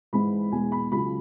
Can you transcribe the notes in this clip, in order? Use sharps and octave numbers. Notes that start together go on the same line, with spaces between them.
G#2 E3 G#3 B5
E2 B2 G#3 G#5
B5
C#2 C#3 F#3 B5